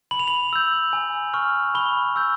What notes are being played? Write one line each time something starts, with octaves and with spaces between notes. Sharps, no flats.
B5 F#7
F7
F#7
E6 G6
G#5
C#6 F6
B5 G7
E6 G6